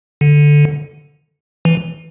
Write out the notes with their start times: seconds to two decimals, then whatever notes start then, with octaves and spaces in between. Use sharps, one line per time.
0.21 D3
1.65 E3